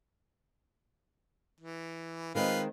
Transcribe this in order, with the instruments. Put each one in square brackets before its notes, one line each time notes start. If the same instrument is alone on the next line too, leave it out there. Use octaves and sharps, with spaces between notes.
[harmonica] E3
[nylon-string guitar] D#3 G#3 C4 [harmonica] F4 B4